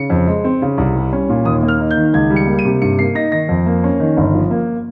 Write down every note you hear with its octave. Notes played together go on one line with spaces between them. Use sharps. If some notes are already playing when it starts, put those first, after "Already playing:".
Already playing: C#3 C#7
F2
G#3
C4
C#3
C2
G3
C#4
A#2
D#2 D#6
A#3
F6
D#4
G6
D#3
C#2 G#6
G3
C#7
A#3
D#7
C3
G2 C#7
A#3 C7
D#4 A#6
D#3 A#6
F2
A#3
C#4
D#3
G1
F3
A#3